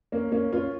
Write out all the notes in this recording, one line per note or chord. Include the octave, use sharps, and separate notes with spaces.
A#3 C#4
A#3 C#4
C#4 F4